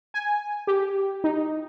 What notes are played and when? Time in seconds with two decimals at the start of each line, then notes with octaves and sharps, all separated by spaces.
0.14 G#5
0.67 G4
1.24 D#4